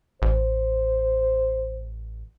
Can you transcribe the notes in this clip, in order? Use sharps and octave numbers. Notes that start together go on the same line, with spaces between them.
A1 C5